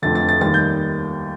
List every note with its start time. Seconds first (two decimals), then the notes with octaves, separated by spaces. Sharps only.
0.02 F1 F2 D3 A6
0.15 A6
0.28 A6
0.41 D#2 D#3 G3 A6
0.54 G6